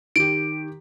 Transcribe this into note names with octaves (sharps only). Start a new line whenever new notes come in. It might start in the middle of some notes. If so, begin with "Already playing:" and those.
D#3 G4 D7